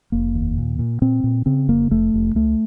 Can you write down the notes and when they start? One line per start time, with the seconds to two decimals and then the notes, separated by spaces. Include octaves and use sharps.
0.12 F1 A#3
0.35 D#2
0.58 A#2
0.79 A#2
1.02 A#2 C4
1.24 A#2
1.46 C#3 C4
1.68 F1 A#3
1.90 F1 A3
2.14 F1
2.35 C#2 A3